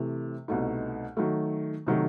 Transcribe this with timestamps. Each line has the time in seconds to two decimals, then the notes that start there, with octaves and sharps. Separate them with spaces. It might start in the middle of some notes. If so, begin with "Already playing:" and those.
Already playing: C3 E3 A3
0.48 C2 B2 A3 D#4
1.17 D#3 F#3 A3
1.87 C3 D#3 F#3 A3